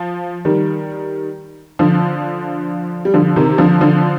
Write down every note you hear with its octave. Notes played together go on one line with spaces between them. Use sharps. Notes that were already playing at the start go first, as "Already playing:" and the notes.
Already playing: F3
D#3 G3
D3 F3
G3
D3 F3
C3 D#3
D3 F3
D3 F3